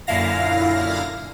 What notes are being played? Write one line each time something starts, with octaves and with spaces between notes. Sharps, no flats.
F#2 A#2 D3 E4 F5 A#6